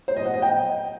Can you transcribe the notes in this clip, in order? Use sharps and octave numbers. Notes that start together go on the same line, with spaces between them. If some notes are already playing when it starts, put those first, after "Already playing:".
C5
D#5
F#5
D#5
G5